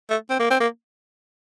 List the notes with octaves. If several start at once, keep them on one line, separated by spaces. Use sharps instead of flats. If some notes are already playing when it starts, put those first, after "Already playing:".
A3
C4
A#3
C4
A#3